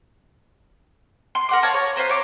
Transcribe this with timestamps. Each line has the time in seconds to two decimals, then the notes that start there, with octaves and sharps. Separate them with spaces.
1.35 C6
1.49 A#4 F#5 D6
1.63 C#5 F5 A5 A#5
1.74 C#5
1.96 F4 B4 C5 A#5
2.09 C#5 D6